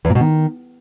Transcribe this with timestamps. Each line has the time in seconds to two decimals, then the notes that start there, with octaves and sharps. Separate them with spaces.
0.05 E2
0.10 A#2
0.15 B2
0.21 D#3